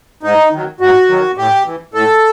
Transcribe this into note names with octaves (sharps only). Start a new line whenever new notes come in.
G#2 D#4
D#3 F#3
G#2 F#4
D#3 F#3
A2 G4
E3
A2 A4